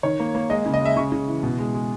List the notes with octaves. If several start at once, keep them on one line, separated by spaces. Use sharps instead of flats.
D#3 C#5
A#3
A#3
G#3 D#5
C#3
D#5
G#3 E5
C#3 C#6
C#3
E3
B2
G#3
G#3